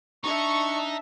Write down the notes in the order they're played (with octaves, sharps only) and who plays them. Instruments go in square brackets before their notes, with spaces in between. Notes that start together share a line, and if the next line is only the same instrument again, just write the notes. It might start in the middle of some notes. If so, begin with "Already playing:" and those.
[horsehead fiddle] D4 E5 [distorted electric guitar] D#4 [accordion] C#6